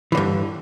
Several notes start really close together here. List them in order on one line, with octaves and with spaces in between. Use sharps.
E3 D3 G2